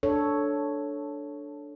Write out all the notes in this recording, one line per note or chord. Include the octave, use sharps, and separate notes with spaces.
D4 A4 C#5